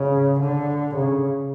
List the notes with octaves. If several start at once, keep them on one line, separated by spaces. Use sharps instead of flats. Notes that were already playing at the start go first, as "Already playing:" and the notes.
Already playing: C#3
D3
C#3